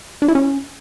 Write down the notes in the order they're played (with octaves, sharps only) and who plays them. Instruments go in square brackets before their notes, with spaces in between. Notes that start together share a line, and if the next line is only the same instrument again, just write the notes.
[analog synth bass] D4
E4
C#4